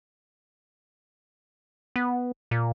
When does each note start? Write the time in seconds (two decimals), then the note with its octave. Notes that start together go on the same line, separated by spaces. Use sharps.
1.96 B3
2.51 A#2